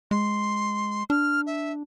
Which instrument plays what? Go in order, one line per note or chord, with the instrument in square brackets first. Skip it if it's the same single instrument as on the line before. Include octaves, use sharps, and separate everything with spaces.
[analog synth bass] G#3 [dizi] C6
[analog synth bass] D4 [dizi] F6
[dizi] E5